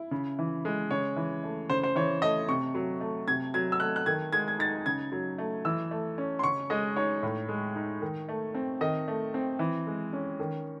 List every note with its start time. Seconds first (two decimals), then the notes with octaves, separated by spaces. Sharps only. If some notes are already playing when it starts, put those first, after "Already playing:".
Already playing: E4
0.11 C#3
0.39 E3
0.65 G#3
0.91 C#3 C#5
1.16 E3
1.44 A3
1.70 C#3 C5
1.83 C5
1.95 E3 C#5
2.22 A3 D#5
2.49 C3 C#6
2.74 F#3
3.01 A3
3.28 C3 G#6
3.54 F#3 G#6
3.72 E6
3.80 A3 F#6
3.96 F#6
4.06 D#3 G#6
4.33 G#3 G#6
4.48 G#6
4.59 D#4 A6
4.86 C#3 G#6
5.12 F#3
5.38 A3
5.65 E3 E6
5.91 A3
6.18 C#4
6.39 C6
6.43 C#3 C#6
6.70 G#3 D#5
6.96 D#4 C#5
7.23 A2
7.49 G#3
7.76 D#4
8.02 D#3
8.29 A3
8.55 C4
8.81 D#3 D#5
9.08 A3
9.34 C4
9.59 E3
9.87 G#3
10.13 C#4
10.39 D#3